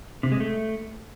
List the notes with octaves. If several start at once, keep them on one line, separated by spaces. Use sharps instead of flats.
C3
G#3
A3